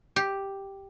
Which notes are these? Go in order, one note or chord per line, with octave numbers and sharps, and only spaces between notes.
G4